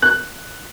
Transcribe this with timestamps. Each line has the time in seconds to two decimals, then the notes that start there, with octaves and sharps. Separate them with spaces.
0.02 F#6